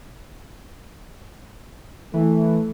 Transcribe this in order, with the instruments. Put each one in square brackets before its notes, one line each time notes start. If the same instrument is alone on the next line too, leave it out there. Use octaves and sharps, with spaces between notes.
[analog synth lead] E3 [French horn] A3